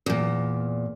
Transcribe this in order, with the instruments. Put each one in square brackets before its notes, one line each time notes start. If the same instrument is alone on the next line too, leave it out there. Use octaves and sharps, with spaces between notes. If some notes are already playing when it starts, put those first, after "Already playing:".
[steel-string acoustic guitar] E2 A#2